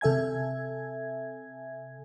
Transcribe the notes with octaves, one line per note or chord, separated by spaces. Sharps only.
C3 A4 E5 G#5 G#6